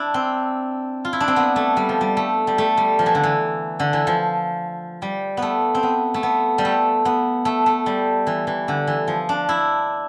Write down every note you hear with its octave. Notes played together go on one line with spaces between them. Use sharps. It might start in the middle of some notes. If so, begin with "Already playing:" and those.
Already playing: D4 E4
C4
F4
E4
D4
C4
B3
A3
G3
F3
G3
A3
G3
A3
G3
F3
E3
D3
E3
D3
E3
F3
G3
B3
A3
C4
B3
A3
B3
G3
A3
B3
A3
A3
G3
E3
E3
D3
E3
F3
D4
E4